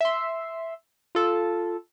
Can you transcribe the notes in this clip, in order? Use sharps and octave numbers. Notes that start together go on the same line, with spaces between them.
E5 C6
F4 A4